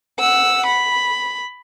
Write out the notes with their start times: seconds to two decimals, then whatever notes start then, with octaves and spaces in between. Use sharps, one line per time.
0.19 F#5 E6
0.66 B5